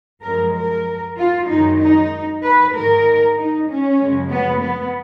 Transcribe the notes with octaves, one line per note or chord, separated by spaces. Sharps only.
F#2 F3 G#3 A#4
A#4
F4
F#2 D#3 G#3 D#4
D#4
B4
G#2 D#3 G#3 A#4
D#4
C#4
F#2 C#3 F3 G#3
B3
B3